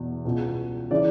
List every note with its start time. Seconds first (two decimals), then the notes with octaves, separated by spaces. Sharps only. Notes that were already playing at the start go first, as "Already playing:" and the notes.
Already playing: E2 B2
0.25 C#2 B2
0.91 C#3 E3 D5